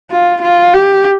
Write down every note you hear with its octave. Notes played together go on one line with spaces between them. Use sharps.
F4
F4
G4